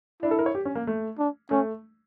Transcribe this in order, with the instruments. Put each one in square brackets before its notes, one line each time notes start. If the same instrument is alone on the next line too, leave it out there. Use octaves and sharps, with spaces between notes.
[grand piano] D4 [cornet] E4
[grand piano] A4
A#4
C#5
G4
C#4
A#3
A3
[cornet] D4
[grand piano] A3 [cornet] C#4